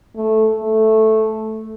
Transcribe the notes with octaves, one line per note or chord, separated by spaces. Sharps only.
A3
A3